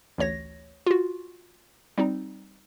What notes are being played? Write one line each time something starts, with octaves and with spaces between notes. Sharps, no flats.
A1 D2 C#5 A#6
F4 F#4
G3 C4 D#4